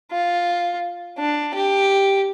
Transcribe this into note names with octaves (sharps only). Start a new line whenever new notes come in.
F4
D4
G4